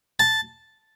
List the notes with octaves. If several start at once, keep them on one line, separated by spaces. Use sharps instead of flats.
A5